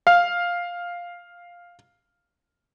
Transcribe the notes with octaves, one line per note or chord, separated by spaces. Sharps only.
F5 F6